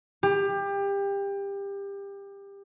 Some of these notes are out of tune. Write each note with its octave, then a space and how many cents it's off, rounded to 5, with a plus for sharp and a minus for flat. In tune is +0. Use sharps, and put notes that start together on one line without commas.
G4 +25